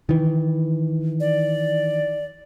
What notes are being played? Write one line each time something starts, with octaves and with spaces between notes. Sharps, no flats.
D#3 E3
D5